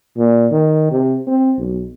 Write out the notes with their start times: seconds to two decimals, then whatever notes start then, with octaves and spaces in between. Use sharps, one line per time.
0.17 A#2
0.52 D#3
0.91 C3
1.27 C4
1.59 B1